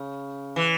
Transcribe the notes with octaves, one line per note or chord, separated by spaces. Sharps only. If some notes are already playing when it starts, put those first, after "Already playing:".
Already playing: C#3
E3